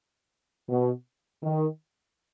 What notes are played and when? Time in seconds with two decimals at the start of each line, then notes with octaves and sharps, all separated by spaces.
0.68 B2
1.43 D#3